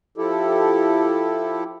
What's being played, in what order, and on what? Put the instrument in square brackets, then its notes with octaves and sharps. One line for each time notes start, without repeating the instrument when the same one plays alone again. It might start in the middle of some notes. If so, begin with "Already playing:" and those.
[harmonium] F3 E4 G4 A4